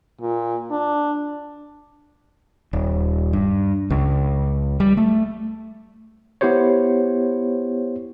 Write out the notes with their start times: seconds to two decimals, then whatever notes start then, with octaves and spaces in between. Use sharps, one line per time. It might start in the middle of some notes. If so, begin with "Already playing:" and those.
0.21 A#2
0.71 D4
2.73 D#1
3.33 G2
3.90 C#2
4.80 G3
4.97 A3
6.41 B3 E4 G4 C5 C#5